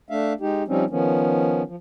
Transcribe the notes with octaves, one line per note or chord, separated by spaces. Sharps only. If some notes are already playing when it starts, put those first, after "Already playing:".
A3 D4 E5 F5
G#3 D#4 G4
F3 G3 C4 C#4 D#4
D#3 F3 B3 C#4
F3